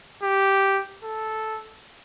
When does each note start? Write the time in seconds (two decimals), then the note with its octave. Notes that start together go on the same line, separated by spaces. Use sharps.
0.23 G4
1.03 A4